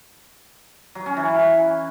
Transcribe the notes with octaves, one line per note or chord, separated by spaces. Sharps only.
F#3
C#4
E3